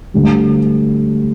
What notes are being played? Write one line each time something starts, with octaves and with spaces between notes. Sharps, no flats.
D2 D3 G3